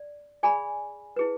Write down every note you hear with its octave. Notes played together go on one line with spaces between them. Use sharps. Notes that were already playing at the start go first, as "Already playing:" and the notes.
Already playing: D5
G#4 D5 G#5 B5
E4 G#4 B4